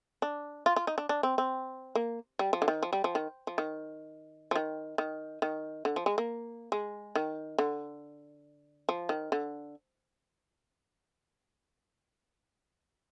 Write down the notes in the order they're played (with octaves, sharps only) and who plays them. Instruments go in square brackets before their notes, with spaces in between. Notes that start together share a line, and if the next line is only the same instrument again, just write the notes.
[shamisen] D4
F4
F4
D#4
D4
D4
C4
C4
A#3
G3
F3
D3
D#3
F3
G3
F3
D#3
F3
D#3
F3
D#3
D#3
D#3
D3
F3
G#3
A#3
G#3
D#3
D3
F3
D#3
D3